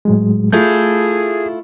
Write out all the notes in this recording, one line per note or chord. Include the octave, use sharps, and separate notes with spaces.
A2 F#3 G#3
A3 E4 F4 G#4 G6